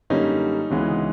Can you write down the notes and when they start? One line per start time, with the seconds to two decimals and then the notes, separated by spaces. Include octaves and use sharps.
0.10 F#2 D3 G3 A#3 C#4 D#4
0.70 D2 C#3 E3 G#3 B3